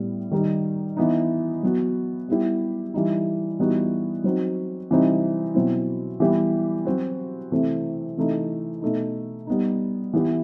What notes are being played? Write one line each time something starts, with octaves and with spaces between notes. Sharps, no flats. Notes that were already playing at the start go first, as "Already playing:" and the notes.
Already playing: A2 G3 B3
D#3 G3 D#4 G4
E3 B3 D#4
F#3 B3 F#4
G3 B3 E4 G4
E3 G3 D#4
E3 G3 B3 D#4 F#4
F#3 C4 D#4 F#4
C3 E3 G3 C4 D#4
B2 F#3 C4 E4
E3 G3 B3 E4 G4
F#3 C4 F#4
C3 E3 A3 C4
C3 E3 A3 D#4
B2 A3 D#4
G3 B3 D#4
E3 B3 E4 G4